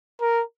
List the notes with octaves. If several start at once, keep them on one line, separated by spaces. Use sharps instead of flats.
A#4